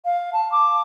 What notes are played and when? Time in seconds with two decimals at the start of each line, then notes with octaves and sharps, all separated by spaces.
0.05 F5
0.33 A5
0.52 D6